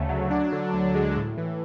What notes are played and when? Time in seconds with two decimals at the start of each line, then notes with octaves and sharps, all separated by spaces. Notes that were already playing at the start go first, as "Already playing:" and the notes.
Already playing: D2 C#3 A3
0.09 F#3
0.31 D4
0.52 D3
0.73 D2
0.94 G#3
1.16 A2
1.37 E3